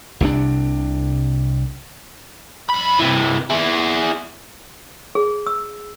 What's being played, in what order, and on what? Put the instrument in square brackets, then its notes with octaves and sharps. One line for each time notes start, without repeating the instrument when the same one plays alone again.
[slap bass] C2 C3 G3 D4
[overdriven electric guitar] F2 B5
C3 E3
E4 G#4
[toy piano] G#4
E6